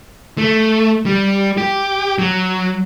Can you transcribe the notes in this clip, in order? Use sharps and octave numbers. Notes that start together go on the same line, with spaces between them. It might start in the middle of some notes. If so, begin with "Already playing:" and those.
A3
G3
G4
F#3